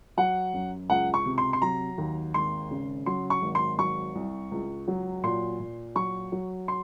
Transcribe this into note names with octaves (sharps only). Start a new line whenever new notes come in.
F#3 F#5
F#2
C#2 F#5
C#6
C3
C6
C6
F#3 A#5
D#2
G#1 C6
C#3
F#3 C6
C#6
G#1
C6
F#3 C#6
C2
C#2
F#3
A#2 C6
A#2
F#3 C#6
F#3
C6